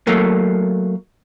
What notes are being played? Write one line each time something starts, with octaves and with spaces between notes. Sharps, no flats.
F#3 A3 A#3